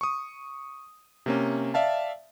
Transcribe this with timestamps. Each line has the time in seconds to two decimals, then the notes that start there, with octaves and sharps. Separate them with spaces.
0.01 C#6 D#6
1.26 C3 A#3 C#4
1.74 D5 E5 F5 A5